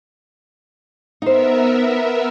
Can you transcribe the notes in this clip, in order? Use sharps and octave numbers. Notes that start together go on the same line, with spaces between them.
B3 D#4 A#4 C5 E5